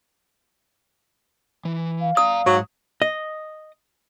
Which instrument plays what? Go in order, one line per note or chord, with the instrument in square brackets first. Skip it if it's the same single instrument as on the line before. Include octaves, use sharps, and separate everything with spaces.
[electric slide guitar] E3
[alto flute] F5
[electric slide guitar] D5 A#5 [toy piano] D#6
[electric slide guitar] G#2 [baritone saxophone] F#3
[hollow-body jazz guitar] D#5